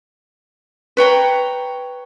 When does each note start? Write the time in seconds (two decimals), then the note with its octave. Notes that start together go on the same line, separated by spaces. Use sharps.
0.97 B4 C#5 G5 A#5